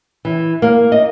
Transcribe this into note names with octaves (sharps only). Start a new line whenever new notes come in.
E3
A#3
D#5